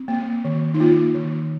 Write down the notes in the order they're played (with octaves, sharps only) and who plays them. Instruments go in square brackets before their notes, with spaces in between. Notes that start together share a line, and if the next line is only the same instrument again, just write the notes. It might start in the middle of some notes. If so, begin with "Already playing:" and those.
Already playing: [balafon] C4
A#3
D#3
D#4
A#3 F4
D#3